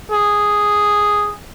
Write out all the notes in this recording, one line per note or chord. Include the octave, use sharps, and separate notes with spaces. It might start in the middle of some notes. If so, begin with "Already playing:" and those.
G#4